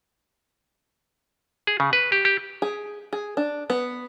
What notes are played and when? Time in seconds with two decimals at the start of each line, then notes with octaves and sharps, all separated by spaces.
1.67 G#4
1.80 C#3
1.93 B4
2.12 G4
2.25 G4
2.62 G#4
3.13 G#4
3.37 D4
3.70 B3